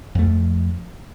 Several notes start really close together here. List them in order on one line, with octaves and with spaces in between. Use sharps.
F2 A3 F3